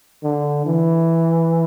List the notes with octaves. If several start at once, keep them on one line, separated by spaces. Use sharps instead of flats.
D3
E3